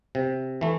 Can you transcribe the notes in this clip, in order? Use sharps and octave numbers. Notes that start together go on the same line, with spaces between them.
C3
E3 A3